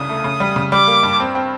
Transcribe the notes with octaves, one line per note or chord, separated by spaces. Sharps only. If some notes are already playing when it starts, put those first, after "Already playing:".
Already playing: C2 C#3 D4 D#6
A3
C#3
G3
C#3
G3 D6
A#3
G2
C4
C4